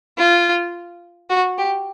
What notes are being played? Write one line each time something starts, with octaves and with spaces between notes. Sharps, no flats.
F4
F#4
G4